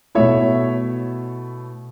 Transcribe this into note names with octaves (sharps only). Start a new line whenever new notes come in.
B2 A3 E4 C#5 E5